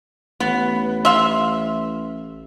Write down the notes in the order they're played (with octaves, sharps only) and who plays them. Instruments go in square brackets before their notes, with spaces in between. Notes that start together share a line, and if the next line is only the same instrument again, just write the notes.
[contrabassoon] A1 [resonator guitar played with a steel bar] B3
[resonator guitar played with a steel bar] E5 [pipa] F5 C6